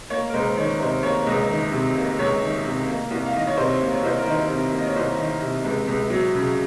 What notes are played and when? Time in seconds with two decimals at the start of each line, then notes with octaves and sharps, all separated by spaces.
0.10 A#3 C#5
0.29 A#4
0.34 C#2 C5
0.57 D#3 C#5
0.80 C3 C5
1.03 A#3 C#5
1.26 C#2 D#5
1.49 D#3
1.72 C3
1.95 A#3
2.18 C#2 C#5
2.42 D#3
2.65 C3
2.87 A#3
3.11 C2
3.26 F5
3.34 D#3 D#5
3.47 C#5
3.57 C3 C5
3.80 A#3
3.92 C#5
4.03 C2 C5
4.18 A#4
4.26 D#3
4.31 C5
4.50 C3
4.72 A#3
4.79 D#5
4.87 C#5
4.96 C2 C5
5.19 D#3
5.41 C3
5.64 C#2
5.87 C#2
6.10 F#3
6.34 C#3